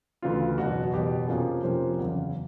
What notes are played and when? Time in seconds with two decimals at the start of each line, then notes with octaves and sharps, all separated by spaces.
0.22 D2 C#3 E3 F4
0.58 F#1 E2 B2 F#4
0.93 F#1 E2 B2 G4
1.28 F2 C3 F3 A#3 C#4 G#4
1.63 F2 C3 F3 A#3 C#4 C5
1.98 F#1 E2 C#3